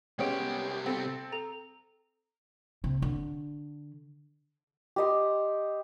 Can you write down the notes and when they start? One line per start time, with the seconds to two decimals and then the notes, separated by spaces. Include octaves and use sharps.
0.19 C2 G#3 B3 C#4 G4 G5 D7
0.86 C4 A4
1.32 A4 A#5 F7
2.84 C3
3.02 D3
4.96 G4 D#5 C6